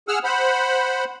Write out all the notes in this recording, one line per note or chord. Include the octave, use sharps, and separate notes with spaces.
G#4 F#5 E6 F6
C5 F#5 B5